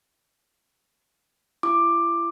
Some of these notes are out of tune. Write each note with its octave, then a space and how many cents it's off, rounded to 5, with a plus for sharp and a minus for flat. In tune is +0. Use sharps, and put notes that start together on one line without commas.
E4 +40 D6 +10